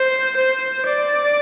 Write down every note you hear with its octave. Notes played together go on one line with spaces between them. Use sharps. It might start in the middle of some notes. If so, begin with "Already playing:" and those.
Already playing: C5
C5
D5